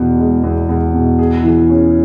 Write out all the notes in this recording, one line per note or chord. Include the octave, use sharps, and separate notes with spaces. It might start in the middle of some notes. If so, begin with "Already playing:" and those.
Already playing: E2 B2
G#3
E2
E2
B2
G#4
E3
C#4